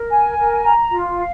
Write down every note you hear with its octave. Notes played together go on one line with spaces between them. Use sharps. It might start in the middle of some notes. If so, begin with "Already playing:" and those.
Already playing: A#4
G#5
A#4
A#5
F4
F5